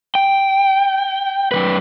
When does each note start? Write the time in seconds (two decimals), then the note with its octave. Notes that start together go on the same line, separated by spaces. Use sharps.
0.15 G5
1.52 F#2 C#3 B4